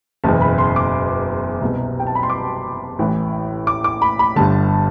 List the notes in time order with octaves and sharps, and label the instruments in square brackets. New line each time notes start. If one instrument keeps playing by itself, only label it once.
[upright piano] F#1 E2 B2 A5
B5
C6
D6
C2 B2
G5
A5
B5
C6
D6
A1 A2 E3
D6
D6
B5
B5
G1 G2 D3 A5